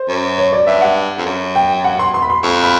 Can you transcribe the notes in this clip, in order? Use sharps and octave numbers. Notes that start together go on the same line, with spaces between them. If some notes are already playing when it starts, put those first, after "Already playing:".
Already playing: C5
F#2
C#5
D5
G2 E5
F#5
F2
F#2
G5
F#5
C6
C6
B5
C6
F2 C#6
B5